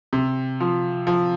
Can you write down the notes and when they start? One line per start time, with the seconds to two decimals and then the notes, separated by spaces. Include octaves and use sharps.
0.13 C3
0.60 F3
1.07 F3